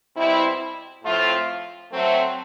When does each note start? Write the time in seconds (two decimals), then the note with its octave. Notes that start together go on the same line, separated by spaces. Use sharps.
0.16 B2 G3 C4 E4
1.03 A2 F3 A3 C4 F4
1.91 F#3 A3 C4